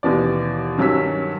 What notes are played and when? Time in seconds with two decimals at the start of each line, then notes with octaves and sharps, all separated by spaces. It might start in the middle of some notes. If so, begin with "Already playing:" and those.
0.03 D#2 B2 E3 D5
0.77 G2 D#3 F#3 C#4 E6 B6